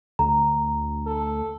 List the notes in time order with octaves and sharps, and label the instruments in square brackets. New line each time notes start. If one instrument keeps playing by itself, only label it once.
[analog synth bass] D2 [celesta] A#5
[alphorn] A4